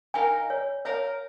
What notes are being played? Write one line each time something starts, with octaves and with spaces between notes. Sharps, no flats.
D#4 A#4 F5 G#5
C#5
A#4 C#5 F5 A#5